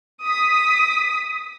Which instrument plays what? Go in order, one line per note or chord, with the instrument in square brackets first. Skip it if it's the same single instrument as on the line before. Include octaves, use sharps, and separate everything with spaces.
[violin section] D#6 B6